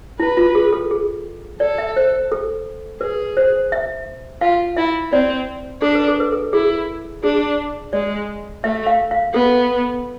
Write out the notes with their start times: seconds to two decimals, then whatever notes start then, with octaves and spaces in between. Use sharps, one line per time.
0.20 E4 B4
0.37 F4
0.55 G#4
0.73 A4
0.91 G#4
1.60 A4 D5
1.78 E5
1.96 C5
2.32 A4
3.01 G#4 B4
3.37 C5
3.72 E5
4.41 F4 F5
4.77 E4 E5
5.12 C4 D5
5.82 D4 A4
5.95 B4
6.08 A4
6.20 B4
6.32 A4
6.53 E4 G#4
7.24 D4 G#4
7.93 G#3 D5
8.64 A3 E5
8.87 F5
9.11 F5
9.33 B3 A4